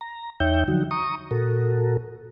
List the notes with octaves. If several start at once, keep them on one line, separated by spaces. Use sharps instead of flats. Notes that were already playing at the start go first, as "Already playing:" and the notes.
A#5
E2 D#4 C#5 E5 G5 G6
D3 F3 F#3 D#4 F#4
A#5 C#6 D#6
A#2 F#4 A4 A#4